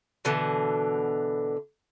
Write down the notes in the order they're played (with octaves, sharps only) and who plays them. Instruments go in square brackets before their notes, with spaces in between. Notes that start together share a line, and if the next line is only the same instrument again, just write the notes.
[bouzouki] B2 D3 E3